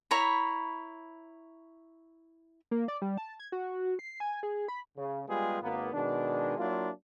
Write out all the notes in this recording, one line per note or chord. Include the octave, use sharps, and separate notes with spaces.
E4 C#5 A#5 B5
A#3
D5
G3
A5
G#6
F#4
C7
G#5
G#4
B5
C#3
G3 G#3 B3 F4 G4 G#4
G#1 A#3 B3
B2 D#3 G#3 D4
F#3 A#3 D4 E4 F4